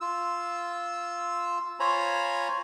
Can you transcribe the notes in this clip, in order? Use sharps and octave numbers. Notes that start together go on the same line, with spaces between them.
F4 E6
F4 C5 C#5 G#5 A#5 B5